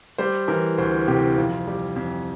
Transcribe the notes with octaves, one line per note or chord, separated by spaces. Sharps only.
G3 C5
E3 A#4
D2 C5
C3 G4
F2 F4
G3
F2